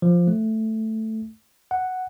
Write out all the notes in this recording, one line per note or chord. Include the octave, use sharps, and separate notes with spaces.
F3
A3
F#5